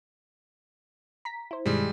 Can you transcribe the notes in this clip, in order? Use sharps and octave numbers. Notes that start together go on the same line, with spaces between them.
A#5 B6
E4 C5
G2 B2 D#3 G3 G#3